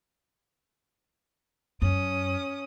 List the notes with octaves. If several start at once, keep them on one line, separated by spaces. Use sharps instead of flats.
F#2 C#4 D#6